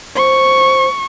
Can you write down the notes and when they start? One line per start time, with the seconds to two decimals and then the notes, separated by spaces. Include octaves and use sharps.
0.16 C5 C#6